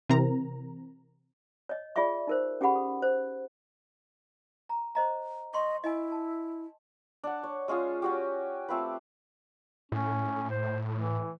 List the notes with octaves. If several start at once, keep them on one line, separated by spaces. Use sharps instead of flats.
C3 E3 C4 A#4 A#5
C#5 D#5
F4 G#4 D5 E5 C#6
D#4 A#4 C5
C#4 G4 G#4 F#5 B5
A4
C5
A#5
C5 D#5 A#5
D#5 C6 C#6
E4 D#5 G#5
A5
D4 F#5
C#5
G#3 C#4 F4 G#4
C#4 F#4 G4
A3 C4 F4 B4
A2 C#4
C5
E3